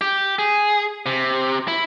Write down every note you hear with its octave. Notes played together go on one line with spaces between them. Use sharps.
G4
G#4
C3
E4